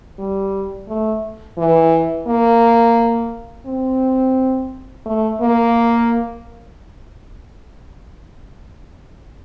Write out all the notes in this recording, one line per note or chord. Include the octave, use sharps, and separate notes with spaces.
G3
A3
E3
A#3
C4
A3
A#3